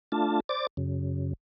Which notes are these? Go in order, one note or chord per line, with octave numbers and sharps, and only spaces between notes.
A3 D4 F4 A5
C5 D5 D6 A6
F#2 C#3